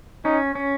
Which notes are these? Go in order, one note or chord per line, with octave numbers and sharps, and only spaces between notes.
C#4 D#4
C#4